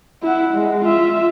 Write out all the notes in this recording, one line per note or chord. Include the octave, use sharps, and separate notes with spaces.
E4 F#5
G#3
F4 E5